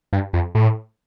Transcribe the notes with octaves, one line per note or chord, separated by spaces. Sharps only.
G2
F2
A2